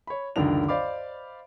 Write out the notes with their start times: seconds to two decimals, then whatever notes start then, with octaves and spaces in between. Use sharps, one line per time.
0.07 C#5 B5
0.36 C#2 F#2 D3 D#3 D4 F7
0.68 C5 D5 D#5 F5 B5 D6